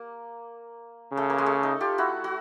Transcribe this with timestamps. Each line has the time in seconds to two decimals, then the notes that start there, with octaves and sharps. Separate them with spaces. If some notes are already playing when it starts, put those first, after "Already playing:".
Already playing: A#3
1.12 C#3
1.17 A3
1.30 A#3
1.38 G#3
1.46 A3
1.63 D#4
1.81 F4 G4
1.98 E4 F#4
2.24 F#4